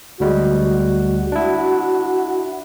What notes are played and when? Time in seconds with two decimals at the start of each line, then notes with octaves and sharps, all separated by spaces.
0.20 D2 G3 G#3 F#4
1.32 D4 E4